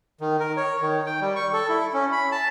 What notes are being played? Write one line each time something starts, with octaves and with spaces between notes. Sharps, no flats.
D#3
A#4
C#5
D#3
G5
G3
C#6
A4
E4
C#4
B5
A5